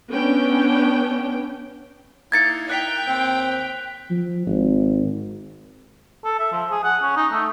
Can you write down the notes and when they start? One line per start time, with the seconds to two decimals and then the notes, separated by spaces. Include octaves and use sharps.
0.12 B3 C#4 D4 G5
2.32 A#3 D#4 E4 G#6 A6 C#7
2.70 G5 F#6 B6 F7
3.07 D#2 C4
4.11 F3
4.47 G#1
6.25 A4
6.40 E5
6.52 F3
6.71 G#4
6.84 F#5
7.03 C#4
7.16 D#4
7.32 A3